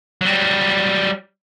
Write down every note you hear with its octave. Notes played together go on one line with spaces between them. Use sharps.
F#3 G3